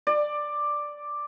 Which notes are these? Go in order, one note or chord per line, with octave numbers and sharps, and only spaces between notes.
D5